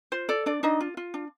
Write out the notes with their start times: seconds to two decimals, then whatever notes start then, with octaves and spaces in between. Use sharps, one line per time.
0.12 F4 C5
0.29 A4 D5
0.46 D4 D5
0.63 D4 D#4 D#5
0.80 F4
0.97 F4
1.14 D4